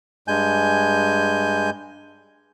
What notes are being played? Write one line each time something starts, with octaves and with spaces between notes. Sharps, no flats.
G2 G#3 G#5 G6